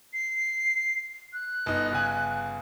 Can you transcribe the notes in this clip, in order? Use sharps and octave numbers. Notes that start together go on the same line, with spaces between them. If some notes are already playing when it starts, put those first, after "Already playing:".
C7
F#6
G1 D#4
G1 C#3 G#5